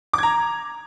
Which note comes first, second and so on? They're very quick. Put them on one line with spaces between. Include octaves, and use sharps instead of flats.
D6 G#6 A#5